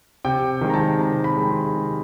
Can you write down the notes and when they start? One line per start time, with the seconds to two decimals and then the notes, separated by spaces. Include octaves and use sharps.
0.25 C3 G5
0.61 D#3 G#3 C4
0.70 A#5
0.74 A5
0.99 C3 A#5
1.24 B5
1.37 D#3 G#3 C4
1.49 C6
1.74 C3